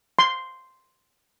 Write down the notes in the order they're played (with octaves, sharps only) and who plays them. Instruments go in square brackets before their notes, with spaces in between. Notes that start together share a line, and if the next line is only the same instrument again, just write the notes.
[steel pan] C6